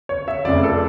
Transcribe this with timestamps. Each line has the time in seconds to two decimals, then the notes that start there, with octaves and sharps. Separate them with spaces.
0.09 C#5
0.28 E5
0.45 F1 F2 C#3 D5
0.63 A4